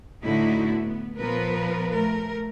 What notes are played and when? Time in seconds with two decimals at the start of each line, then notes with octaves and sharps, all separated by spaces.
0.23 A2 D3 D#4 E4 F#4
0.71 B3
1.18 A#2 F3 B3 A#4 B4
1.91 A3 A#4